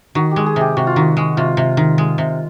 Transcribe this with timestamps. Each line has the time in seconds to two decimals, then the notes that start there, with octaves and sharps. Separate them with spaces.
0.15 D#3 F#4
0.31 G4
0.36 G#3
0.46 G#4
0.56 C3 G4
0.77 C3 F#4
0.87 F4
0.96 D#3 F#4
1.17 G#3
1.37 C3 F4
1.57 C3
1.77 D#3
1.98 G#3
2.18 C3